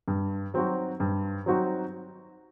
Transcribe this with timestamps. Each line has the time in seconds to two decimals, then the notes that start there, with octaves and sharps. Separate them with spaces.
0.08 G2
0.54 F#3 C4 D#4 F#4
1.00 G2
1.46 F#3 C4 D#4 F#4